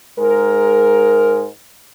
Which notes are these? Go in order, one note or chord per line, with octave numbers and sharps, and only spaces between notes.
G#2 G#3 A#4